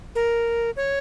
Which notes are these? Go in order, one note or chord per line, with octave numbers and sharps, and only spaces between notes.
A#4
C#5